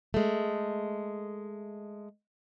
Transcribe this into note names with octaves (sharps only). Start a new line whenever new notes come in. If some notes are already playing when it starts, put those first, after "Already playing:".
G#3 A3